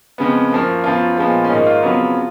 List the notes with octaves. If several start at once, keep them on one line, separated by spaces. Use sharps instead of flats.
F2 C#3 G#3 B3
F#2 F3 A#3
F#2 F3 B3 F4
A#2 F3 G#3 B3
C#4
G#2 D#3 A#3 D#4
F4
F2 C#3 F#3 B3